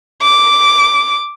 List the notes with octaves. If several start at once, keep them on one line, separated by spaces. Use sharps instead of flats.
D6